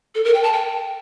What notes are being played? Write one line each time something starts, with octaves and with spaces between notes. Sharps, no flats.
A4
A#4
G5
A5
G5